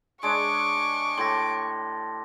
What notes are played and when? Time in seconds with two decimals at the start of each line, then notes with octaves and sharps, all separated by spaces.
0.23 G#3 D4 C#5 C#6 D6
1.18 A2 G4 A4 C6 A#6